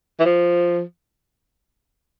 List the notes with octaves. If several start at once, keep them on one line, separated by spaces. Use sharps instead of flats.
E3
F3